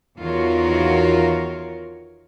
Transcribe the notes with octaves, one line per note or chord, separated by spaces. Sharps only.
E2 D#3 F4 F#4 A#4 C#5